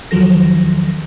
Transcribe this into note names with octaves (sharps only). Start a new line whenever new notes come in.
E2 D#3 F3 F#3 A4 A#6